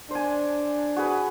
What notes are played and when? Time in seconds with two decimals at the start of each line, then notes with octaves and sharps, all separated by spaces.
0.11 D4 C5 G#5
0.96 F#4 G#4 B4